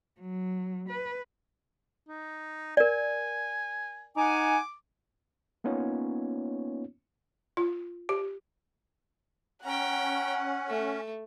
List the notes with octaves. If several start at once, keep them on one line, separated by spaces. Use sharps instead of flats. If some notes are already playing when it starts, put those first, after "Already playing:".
F#3
B4
D#4
A#4 D5 G#5
D#4 F#5 G#5 D6
A#3 B3 C#4 D#4 F4 C#5
F4
G4
C#4 F#5 G5 A#5
A3